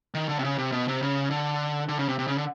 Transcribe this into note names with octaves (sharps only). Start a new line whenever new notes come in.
D#3
D3
C3
C#3
C3
B2
C3
C#3
D3
D3
C#3
C3
C3
C#3
D3